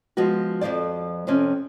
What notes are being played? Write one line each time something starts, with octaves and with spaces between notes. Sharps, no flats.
F3 G#3 B3 F#4
F2 G#2 F3 C5 D5
F2 C3 C4 C#4